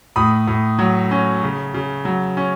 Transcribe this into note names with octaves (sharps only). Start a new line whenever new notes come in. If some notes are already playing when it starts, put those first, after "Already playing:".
A2 B5 D#6
A2
F#3
C#4
C#3
C#3
F#3
C#4